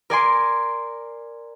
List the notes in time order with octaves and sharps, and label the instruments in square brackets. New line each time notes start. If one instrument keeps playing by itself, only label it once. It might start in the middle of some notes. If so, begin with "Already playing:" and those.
[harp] A#4 D5 G#5 C6